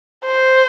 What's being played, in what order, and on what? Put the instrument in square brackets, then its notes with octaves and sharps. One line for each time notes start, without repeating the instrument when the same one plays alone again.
[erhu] C5